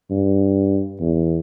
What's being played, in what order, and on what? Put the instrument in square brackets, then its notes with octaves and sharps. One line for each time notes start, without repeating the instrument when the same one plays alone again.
[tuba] G2
E2